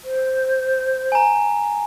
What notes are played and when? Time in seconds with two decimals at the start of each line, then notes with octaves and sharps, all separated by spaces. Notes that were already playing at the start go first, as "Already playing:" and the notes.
0.04 C5
1.12 G#5 A#5